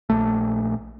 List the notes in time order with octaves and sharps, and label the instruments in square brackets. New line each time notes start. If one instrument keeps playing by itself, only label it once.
[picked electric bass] A#1 A3